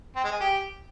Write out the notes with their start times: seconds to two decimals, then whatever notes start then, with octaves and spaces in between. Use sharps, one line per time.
0.16 C4
0.24 G#3
0.32 G#4
0.40 G4